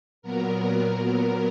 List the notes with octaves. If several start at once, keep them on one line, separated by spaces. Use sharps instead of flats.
A#2 F#3 B3 A#4